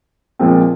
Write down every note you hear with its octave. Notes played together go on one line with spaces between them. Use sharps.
A#2 F3 G#3 C4